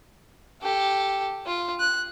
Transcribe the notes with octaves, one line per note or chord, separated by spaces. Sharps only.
G4 A4
F4
F#6